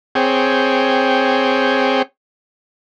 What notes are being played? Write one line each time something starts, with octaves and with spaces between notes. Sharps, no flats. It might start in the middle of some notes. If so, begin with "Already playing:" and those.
C4 G#4 C#5 G5